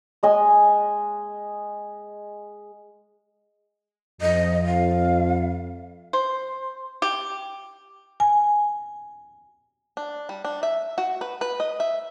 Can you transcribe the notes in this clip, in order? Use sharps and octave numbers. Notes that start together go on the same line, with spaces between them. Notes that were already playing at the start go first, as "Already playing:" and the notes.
G#3 D#5 G#5
F2 D#5
F5
C5
G4
G#5
D4
G3
D4
E5
F#4
B4
B4
D#5
E5